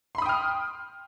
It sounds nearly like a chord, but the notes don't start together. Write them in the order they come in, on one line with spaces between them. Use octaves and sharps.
C6 B5 D#6 G5 F6